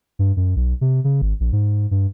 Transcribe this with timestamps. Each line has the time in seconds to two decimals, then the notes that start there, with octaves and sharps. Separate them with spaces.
0.19 G2
0.37 F#2
0.56 B1
0.81 C3
1.04 C#3
1.22 G#1
1.40 A#1
1.52 G#2
1.91 G2